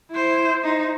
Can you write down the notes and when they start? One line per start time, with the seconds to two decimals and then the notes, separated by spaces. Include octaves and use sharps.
0.11 E4 C5
0.64 D#4